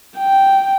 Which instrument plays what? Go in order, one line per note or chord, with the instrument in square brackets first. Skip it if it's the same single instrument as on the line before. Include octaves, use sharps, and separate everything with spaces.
[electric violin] G5